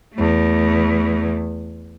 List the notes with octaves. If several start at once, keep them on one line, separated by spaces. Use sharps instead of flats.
E2 A3